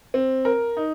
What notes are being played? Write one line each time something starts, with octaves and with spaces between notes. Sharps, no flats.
C4
A#4
D#4